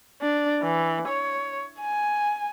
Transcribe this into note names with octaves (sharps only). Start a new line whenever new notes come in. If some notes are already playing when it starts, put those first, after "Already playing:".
D4
E3
C#5
G#5